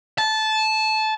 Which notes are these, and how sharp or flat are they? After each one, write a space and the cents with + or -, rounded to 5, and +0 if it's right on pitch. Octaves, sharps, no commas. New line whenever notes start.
A5 -15